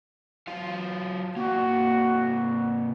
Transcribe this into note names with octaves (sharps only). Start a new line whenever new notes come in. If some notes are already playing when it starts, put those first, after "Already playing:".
F#3 F4 F5
C3 A#3 F#4